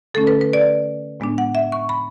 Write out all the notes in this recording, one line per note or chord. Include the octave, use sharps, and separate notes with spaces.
D3 A3 C#4 A4
B4
B4
D5
A2 G#3 B3 D4
F#5
E5
C#6
B5